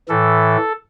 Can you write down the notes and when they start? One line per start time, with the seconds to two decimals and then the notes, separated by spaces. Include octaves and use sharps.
0.09 A2 E3 A4